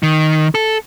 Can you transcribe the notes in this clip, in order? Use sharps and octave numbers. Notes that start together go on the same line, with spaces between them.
D#3
A4